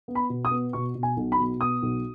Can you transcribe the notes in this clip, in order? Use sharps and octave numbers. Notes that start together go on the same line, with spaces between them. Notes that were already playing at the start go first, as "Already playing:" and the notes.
B3
B5
B2
D#6
B3
B2 C#6
B2
G#5
B1
B5
B2
B3 D#6
B1